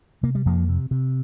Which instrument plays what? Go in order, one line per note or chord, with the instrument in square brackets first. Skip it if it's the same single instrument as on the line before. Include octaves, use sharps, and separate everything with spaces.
[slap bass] C3 A#3
G3
F2 F3 A#3
C3
C3